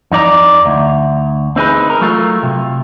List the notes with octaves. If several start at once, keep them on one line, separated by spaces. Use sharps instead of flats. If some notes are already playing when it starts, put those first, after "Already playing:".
F2 D#4 D5 A#5
D2
C4 D#4 G#4 B4
A#4
F#3 A3 F4
C3